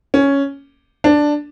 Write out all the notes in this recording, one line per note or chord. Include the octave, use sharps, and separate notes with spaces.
C#4
D4